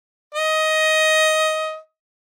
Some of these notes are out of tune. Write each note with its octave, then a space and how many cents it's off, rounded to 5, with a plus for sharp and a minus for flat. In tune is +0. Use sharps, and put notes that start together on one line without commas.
D#5 +15